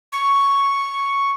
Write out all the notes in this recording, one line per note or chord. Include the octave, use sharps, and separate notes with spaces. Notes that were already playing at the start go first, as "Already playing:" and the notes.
C#6